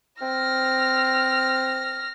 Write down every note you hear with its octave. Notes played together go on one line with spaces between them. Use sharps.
C4 F6 A#6